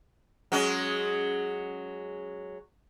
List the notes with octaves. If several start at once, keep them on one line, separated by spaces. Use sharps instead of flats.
F#3 G#3 C#4